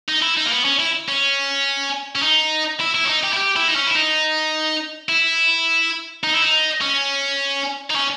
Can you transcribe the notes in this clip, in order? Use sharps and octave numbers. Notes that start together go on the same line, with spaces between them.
D#4
E4
D#4
A#3
B3
C#4
E4
C#4
C#4
D#4
E4
E4
C#4
D#4
G4
E4
G4
E4
D#4
C#4
E4
D#4
E4
D#4
E4
D#4
C#4
D#4
C#4